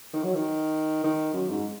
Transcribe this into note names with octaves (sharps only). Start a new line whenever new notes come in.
D#3
F#3
D#3
D#3
F#2
G#2